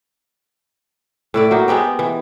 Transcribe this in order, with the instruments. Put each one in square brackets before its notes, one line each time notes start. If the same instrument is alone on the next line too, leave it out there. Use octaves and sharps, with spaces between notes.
[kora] A2 E4 D5
F#3 A#3 D#4
G#3 B3 C4 G4
E3